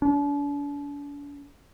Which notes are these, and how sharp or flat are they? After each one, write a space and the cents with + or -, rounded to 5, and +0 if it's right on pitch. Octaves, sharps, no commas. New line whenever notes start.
D4 -40